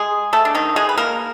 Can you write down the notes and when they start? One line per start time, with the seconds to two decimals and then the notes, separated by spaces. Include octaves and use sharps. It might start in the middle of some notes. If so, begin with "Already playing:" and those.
Already playing: G#3 G#4
0.33 A3 A4
0.45 D4
0.55 D#3 D#4
0.76 G#3 G#4
0.89 B4
0.98 A#3 A#4